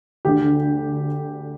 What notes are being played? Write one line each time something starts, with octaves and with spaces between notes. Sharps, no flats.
D2 D3 G4